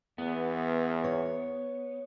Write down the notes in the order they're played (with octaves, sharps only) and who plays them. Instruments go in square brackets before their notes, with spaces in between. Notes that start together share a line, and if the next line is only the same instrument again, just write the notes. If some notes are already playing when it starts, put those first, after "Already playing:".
[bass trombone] E2 [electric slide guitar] B3
[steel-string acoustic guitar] C#5